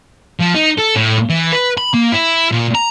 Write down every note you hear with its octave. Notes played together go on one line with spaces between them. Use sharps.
F3
D#4
A4
A2
E3
B4
B5
A#3
E4
A#2
A#5